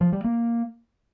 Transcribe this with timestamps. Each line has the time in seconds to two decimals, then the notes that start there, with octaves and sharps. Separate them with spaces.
0.01 F3
0.13 G3
0.24 A#3